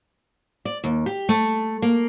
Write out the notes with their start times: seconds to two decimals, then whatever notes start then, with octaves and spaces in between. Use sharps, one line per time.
0.65 D5
0.84 D#2
1.06 G4
1.29 A3
1.82 A#3